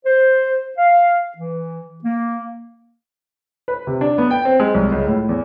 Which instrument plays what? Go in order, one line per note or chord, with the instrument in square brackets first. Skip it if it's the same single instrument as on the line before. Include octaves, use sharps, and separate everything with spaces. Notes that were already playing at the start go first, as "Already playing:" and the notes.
[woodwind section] C5
F5
E3
A#3
[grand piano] B4
C3
D4
B3
G5
C4
G#3
C2
C#2
A2
E2